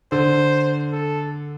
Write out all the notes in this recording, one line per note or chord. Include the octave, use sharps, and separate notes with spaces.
D3 C5
A4